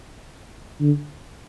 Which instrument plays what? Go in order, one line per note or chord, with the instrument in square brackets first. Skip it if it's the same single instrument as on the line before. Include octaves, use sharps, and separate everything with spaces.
[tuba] D3